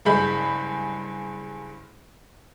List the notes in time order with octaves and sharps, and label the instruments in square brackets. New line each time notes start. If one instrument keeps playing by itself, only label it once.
[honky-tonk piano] F#1 G2 G#3 B5 G6